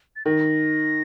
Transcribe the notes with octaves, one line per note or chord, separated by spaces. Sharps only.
A6
D#3 A#6